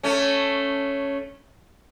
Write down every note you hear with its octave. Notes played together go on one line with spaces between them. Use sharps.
A3 C#4